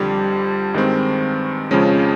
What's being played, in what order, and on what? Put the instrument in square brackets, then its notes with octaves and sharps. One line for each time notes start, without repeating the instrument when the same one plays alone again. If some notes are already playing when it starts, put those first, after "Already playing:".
Already playing: [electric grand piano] F2 D3 G3
G2 D#3 G#3 C4
F2 C#3 F3 G#3 C#4